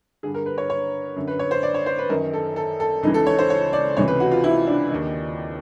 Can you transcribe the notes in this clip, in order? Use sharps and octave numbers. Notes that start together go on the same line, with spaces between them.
G2 D3 G#4
A#4
B4
C#5
C#5
F#2 D3
B4
C#5
C5
D5
C#5
C5
B4
F#2 D#3 A#4
A4
A4
A4
C#2 C#3 E3 D#4
A4
C#5
C5
C#5
D5
C#2 C3 E3 C#5
B4
F#4
F4
E4
D4
D#2 D#3